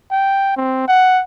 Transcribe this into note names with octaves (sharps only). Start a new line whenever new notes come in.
G5
C4
F#5